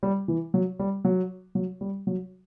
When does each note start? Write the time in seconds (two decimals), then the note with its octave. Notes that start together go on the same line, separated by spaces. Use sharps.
0.03 G3
0.28 E3
0.54 F#3
0.79 G3
1.05 F#3
1.55 F#3
1.81 G3
2.07 F#3